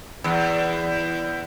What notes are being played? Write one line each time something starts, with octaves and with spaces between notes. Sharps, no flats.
E2